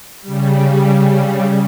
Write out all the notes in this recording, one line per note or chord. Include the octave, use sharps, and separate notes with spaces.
C#3 G3